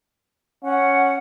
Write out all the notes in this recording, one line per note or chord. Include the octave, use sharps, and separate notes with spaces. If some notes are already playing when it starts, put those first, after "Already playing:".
C#4 F#5